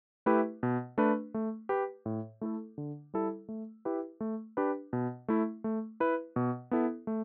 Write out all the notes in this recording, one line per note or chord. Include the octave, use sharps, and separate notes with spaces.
A3 E4 G4 B4
B2
A3 D4 B4
A3
G4 B4
A2
A3 E4 A4
D3
G3 E4 A4
A3
E4 G4 B4
A3
D4 G4 B4
B2
A3 E4
A3
E4 B4
B2
B3 E4 A4
A3